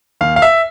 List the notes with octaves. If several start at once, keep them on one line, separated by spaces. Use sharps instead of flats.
D#2 F5
F5
E5